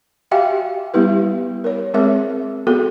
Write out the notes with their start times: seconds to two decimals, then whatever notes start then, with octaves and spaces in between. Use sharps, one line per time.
0.31 F#4 G4 E5 F5 G5 G#5
0.94 G3 B3 E4 G4 B4
1.64 A#4 C#5
1.94 G#3 C4 G#4 A#4 E5
2.67 B3 F#4 G#4 A4